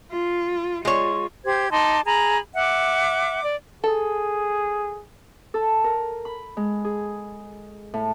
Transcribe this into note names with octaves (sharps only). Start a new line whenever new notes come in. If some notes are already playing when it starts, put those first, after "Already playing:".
F4
G#3 F4 C#5
G4 C5 G#6
D#4 A5 C6 D6
G#4 A#5 B5
E5 F#5 D6
D5
G#4 A4
A4
A#4
B5
G#3
G#4
A2